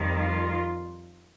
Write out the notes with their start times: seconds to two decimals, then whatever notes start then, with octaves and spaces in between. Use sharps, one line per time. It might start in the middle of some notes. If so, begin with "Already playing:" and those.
Already playing: F2 D#3 G3
0.20 F4